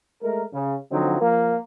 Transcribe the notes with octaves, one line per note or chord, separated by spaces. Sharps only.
G#3 A3 A#4
C#3
D3 F3 F#3 C4 D#4
F3 A#3 A#4